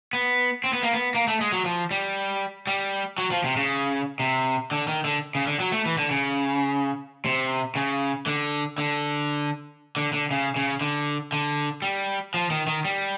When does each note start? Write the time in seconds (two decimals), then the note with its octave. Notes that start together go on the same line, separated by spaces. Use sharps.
0.13 B3
0.64 C4
0.73 B3
0.83 A#3
0.92 B3
1.15 A#3
1.28 A3
1.41 G#3
1.52 F#3
1.66 F3
1.91 G3
2.67 G3
3.18 F#3
3.31 F3
3.44 C3
3.57 C#3
4.20 C3
4.71 D3
4.88 D#3
5.05 D3
5.35 C#3
5.47 D3
5.60 F#3
5.72 A3
5.86 E3
5.98 D3
6.11 C#3
7.25 C3
7.76 C#3
8.27 D3
8.78 D3
9.97 D3
10.13 D3
10.31 C#3
10.56 C#3
10.81 D3
11.32 D3
11.82 G3
12.34 F3
12.50 D#3
12.67 D#3
12.85 G3